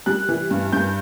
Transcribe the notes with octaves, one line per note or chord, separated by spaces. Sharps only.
G3 F#6
E3
G2
G2 G6